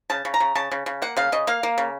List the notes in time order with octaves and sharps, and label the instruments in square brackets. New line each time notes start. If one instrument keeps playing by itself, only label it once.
[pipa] C#3 A5
C#3
A#5
C#3
C#3 A5
C#3
C#3
A#3 F#5
C#3 F5
C#3 D#5
A#3 F5
A#3
C#3